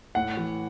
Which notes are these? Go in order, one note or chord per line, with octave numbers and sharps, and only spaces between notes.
A2 F#5
E3